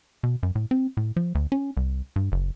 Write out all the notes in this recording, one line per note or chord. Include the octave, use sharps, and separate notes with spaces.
B2
F#2
A2
C4
A2
F3
D2
C#4
C2
G2
F#1